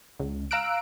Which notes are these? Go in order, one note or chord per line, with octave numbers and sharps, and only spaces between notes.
C#2
F5 A#5 E6 F#6 D7